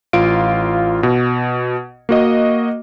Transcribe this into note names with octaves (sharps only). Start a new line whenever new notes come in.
A1 F4 F5 D7
B2
A#3 F#4 D#5